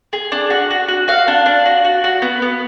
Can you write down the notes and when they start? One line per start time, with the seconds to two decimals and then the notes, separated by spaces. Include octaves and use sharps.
0.13 G#4
0.32 D4
0.50 F#4
0.71 F#4
0.88 F#4
1.08 F#4 F5
1.28 D4
1.46 D4
1.65 F#4
1.84 F#4
2.04 F#4
2.22 B3
2.42 B3